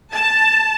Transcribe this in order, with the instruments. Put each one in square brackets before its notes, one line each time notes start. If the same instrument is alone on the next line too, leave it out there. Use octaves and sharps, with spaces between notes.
[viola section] A5